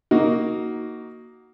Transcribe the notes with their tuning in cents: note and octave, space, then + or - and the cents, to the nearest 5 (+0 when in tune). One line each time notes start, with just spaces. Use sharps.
A#3 +0 D#4 +10 F#4 +5